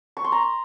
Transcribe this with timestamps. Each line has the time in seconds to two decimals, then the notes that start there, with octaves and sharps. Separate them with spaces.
0.17 C#6
0.24 C6
0.32 A#5